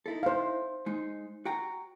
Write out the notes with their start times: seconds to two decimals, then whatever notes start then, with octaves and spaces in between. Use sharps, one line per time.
0.06 D#4 E4 A4
0.23 C5 F5
0.86 G#3 D#4
1.45 F#4 G5 A#5